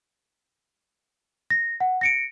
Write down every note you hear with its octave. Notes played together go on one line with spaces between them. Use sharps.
A#6
F#5
A#6 C#7 D7